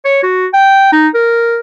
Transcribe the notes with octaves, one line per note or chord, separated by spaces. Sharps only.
C#5
F#4
G5
D#4
A#4